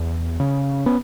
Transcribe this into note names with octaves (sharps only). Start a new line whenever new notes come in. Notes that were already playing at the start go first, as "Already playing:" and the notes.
Already playing: E2
C#3
B3 C#4